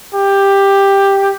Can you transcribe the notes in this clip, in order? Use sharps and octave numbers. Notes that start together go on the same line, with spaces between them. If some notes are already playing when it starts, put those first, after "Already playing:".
G4